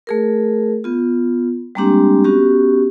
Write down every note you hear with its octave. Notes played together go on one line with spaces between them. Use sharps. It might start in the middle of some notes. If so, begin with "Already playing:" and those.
A3 G#4 A#4
B3 F4
G3 G#3 A#3 C4 D4 G4
B3 C#4 F#4 G4